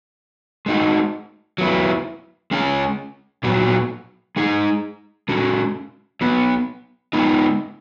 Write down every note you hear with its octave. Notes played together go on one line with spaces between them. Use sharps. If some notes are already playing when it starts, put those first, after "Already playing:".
G#3 D#4 F#4
F#3 B3 E4
G#3 C#4 G#4
A#2 F#3 B3 F#4
G#3 D#4 G#4
G#3 C#4 F#4
F#3 B3 F#4
G#3 B3 D#4